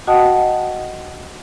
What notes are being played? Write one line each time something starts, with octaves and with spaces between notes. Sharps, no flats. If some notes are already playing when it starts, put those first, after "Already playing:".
F#4 D#5 F#5 G5 A5 D#6